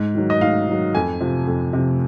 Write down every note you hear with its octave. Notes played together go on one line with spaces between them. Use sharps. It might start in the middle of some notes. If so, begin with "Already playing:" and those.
Already playing: G#2
D#3 F#3
D#5
G#2 F5
D#3 F#3
F2 G#5
C3 F3
F2
C3 F3